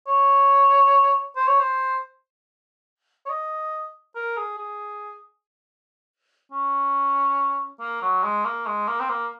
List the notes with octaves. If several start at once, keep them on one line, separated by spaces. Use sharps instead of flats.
C#5
C5
C#5
C5
C#5
D#5
A#4
G#4
G#4
C#4
A#3
F#3
G#3
A#3
G#3
A#3
C4
A#3